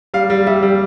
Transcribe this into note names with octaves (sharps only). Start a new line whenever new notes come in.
G3 F5
G3
G3 E5
G3